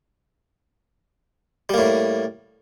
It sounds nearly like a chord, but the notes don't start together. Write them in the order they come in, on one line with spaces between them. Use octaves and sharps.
G3 A#3 A2